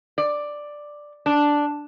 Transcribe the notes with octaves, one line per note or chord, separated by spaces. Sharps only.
D5
D4